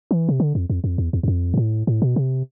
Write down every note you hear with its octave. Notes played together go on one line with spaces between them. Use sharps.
E3
C3
D3
F2
F2
F2
E2
E2
E2
F2
G2
A2
A2
B2
C3